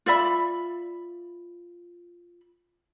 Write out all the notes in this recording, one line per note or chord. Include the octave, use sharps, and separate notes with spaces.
F4 D5 E5 B5